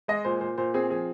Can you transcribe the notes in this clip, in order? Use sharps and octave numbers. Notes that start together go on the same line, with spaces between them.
G#3 D#5
A#2 C5
A#2 C5
A#2 C5
C4 G#4
F3 G#4